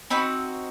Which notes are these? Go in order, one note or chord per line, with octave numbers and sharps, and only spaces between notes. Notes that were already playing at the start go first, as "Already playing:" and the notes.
C4 D#4 F#4 B5